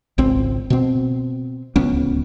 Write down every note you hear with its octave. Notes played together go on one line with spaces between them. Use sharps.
G#1 C#2 C4
B2 C4
D1 C#2 B3 C#4